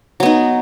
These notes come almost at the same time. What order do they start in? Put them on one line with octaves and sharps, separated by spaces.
F#3 B3 D#4